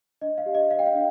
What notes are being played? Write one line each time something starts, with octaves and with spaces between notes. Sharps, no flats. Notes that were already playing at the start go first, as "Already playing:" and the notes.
D4 D#5
F5
G4
D#5
C5 F5
G5
F5
D4